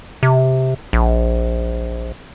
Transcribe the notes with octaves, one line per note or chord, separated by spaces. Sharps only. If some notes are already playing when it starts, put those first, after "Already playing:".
C3
A#1